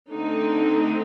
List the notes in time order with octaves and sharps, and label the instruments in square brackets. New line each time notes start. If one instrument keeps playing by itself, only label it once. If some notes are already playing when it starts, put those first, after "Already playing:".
[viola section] D3 A3 C4 D#4